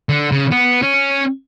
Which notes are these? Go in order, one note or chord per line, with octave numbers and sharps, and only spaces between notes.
D3
C#3
B3
C#4